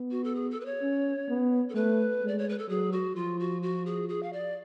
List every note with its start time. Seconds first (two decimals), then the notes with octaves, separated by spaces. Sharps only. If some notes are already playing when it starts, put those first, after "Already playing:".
Already playing: B3
0.11 F#4
0.24 A4
0.35 G#4
0.51 A4
0.60 B4
0.66 C#5
0.82 C#4
1.29 B3
1.70 A4
1.75 A3 B4
2.23 G#3
2.28 D5
2.39 C#5
2.49 B4
2.58 A4
2.69 F#3 G#4
2.92 F#4
3.15 F3 F4
3.40 F#4
3.62 F#4
3.86 G#4
4.09 G#4
4.23 F5
4.33 D5